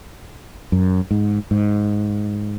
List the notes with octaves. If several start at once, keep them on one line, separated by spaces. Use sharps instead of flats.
F#2
G#2
G#2